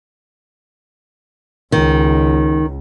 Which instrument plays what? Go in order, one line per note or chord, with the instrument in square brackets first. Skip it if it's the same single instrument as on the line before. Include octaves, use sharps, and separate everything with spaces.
[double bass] C#2 [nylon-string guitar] D#3